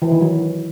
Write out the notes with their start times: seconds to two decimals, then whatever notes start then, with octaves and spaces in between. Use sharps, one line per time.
0.02 E3
0.11 D#3
0.21 F#3